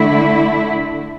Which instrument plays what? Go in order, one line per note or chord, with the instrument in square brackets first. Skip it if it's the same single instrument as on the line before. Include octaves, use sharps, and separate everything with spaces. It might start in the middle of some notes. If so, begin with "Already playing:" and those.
Already playing: [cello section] D3 A3 E4